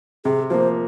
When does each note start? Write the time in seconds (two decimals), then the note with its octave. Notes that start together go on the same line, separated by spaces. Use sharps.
0.25 C3 G#4
0.50 F3 A#3 C5